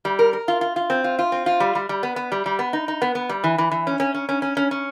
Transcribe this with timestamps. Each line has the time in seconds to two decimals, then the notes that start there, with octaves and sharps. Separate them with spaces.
0.05 G3
0.19 A#4
0.33 A#4
0.48 F4
0.61 F4
0.76 F4
0.90 C4
1.04 F4
1.19 F4
1.32 C4
1.46 F4
1.60 G3
1.75 G3
1.89 G3
2.03 B3
2.16 B3
2.32 G3
2.46 G3
2.59 B3
2.73 D#4
2.88 D#4
3.02 B3
3.15 B3
3.29 G3
3.44 E3
3.58 E3
3.71 E3
3.87 C#4
4.00 C#4
4.14 C#4
4.29 C#4
4.42 C#4
4.57 C#4
4.71 C#4